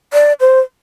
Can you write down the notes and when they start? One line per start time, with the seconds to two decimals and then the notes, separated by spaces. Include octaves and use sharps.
0.13 D5
0.40 C5